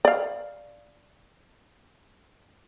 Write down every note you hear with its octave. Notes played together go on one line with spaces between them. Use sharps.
D5 F5